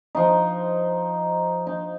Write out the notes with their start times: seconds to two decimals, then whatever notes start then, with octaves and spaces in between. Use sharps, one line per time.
0.15 F3 D#4
1.67 D#4